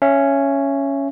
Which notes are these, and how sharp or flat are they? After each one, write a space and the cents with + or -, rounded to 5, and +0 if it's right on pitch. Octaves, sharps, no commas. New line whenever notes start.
C#4 +0 E5 +25